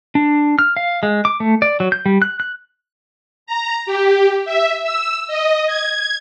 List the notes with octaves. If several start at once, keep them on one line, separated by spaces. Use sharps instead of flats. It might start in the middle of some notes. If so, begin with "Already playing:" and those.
D4
F6
F5
G#3
D6
A3
D5
F#3
G6
G3
F#6
F#6
A#5
G4
E5
E6
D#5
G#6